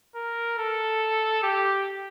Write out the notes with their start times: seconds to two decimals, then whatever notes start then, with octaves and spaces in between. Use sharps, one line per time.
0.16 A#4
0.58 A4
1.43 G4